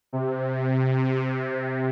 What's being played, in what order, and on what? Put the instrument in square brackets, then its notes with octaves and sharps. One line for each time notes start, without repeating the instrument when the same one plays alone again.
[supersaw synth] C3